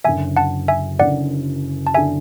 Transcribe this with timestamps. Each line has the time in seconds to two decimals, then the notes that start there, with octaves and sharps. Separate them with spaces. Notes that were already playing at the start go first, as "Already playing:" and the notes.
0.05 F#1 F#2 D3 E5 G#5
0.37 F#5 A5
0.68 E5 G#5
0.99 F#1 F#2 D3 D5 F#5
1.87 A5
1.94 D3 E5 G#5